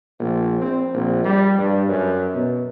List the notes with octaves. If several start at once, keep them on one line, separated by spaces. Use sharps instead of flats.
A#1
C4
A#1
G3
G2
F#2
B2